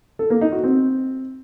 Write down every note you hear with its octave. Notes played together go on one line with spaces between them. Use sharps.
A4
A#3
D#4
F#4
C4